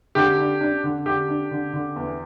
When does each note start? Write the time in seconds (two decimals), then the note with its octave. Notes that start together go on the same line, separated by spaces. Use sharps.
0.15 D3 G4
0.38 D4
0.61 D4
0.84 D3
1.06 D3 G4
1.28 D4
1.51 D3
1.73 D3
1.96 E2